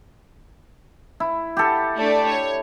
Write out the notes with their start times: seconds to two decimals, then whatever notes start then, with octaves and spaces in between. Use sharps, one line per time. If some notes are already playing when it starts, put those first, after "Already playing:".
1.20 E4
1.57 G4 A4
1.97 A3 D4 D5
2.28 C#5